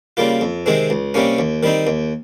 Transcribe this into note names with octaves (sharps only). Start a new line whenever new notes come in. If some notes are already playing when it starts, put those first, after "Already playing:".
C#3 G3 A#3 F4
F2
C3 D#3 G#3 C4
C#2
C3 G3 A#3 C#4
D#2
D#3 G3 C4 D#4
D#2